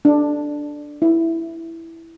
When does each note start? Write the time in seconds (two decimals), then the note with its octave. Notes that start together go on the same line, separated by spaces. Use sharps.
0.05 D4
1.02 E4